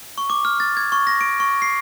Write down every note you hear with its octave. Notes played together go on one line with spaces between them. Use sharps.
C#6
D6
F6
A6
G#6
C#6
A#6
D7
C#6
C7